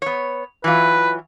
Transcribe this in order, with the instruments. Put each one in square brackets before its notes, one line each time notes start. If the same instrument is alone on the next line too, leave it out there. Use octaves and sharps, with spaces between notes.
[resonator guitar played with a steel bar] B3 C#5
[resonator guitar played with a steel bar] E3 F#3 F4 [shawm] B4